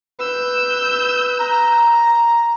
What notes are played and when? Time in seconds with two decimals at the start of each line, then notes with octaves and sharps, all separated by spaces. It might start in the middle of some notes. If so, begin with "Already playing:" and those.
0.19 B4 E6 G6
1.39 A#5